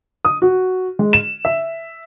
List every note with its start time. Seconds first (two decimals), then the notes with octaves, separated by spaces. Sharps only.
0.25 D#6
0.42 F#4
0.99 G#3
1.13 E7
1.45 E5